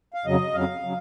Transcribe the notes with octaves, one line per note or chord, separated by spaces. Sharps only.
F5
F2 C#3 F#3 D#5
F2 C#3 F#3 F5
C#3 F#3